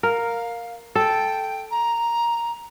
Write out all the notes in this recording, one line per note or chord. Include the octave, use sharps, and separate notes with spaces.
A#4 F5
A4 G5
A#5